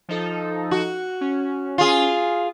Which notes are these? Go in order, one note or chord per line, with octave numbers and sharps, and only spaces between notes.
F3 D#4 A4
F#4
C#4
F4 G#4